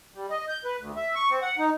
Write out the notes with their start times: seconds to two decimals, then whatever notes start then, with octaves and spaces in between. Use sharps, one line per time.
0.14 G3
0.30 D#5
0.48 G6
0.65 B4
0.79 D2
0.96 E5
1.15 C#6
1.30 C4
1.42 F#5
1.58 D#4